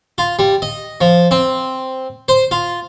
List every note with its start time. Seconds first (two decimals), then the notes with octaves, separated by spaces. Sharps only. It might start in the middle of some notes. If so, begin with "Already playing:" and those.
0.18 F4
0.39 G3
0.62 D#5
1.01 F3
1.31 C4
2.28 C5
2.51 F4